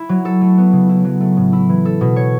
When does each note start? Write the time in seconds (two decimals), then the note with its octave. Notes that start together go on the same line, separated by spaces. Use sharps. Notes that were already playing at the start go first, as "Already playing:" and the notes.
Already playing: E4
0.09 F#3
0.25 A4
0.41 A3
0.58 B3
0.73 C#3
0.89 E4
1.04 F#3
1.20 A3
1.37 A2
1.53 E4
1.69 E3
1.85 A4
2.01 B2
2.16 C#5